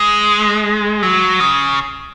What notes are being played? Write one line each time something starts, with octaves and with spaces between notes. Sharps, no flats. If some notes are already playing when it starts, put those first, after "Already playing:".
Already playing: G#3
F#3
C#3